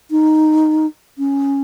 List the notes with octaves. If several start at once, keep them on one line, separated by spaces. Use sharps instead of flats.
D#4
C#4